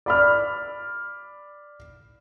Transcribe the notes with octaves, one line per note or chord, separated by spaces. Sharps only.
D5 B5 F6